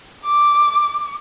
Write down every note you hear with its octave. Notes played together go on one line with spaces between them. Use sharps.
D6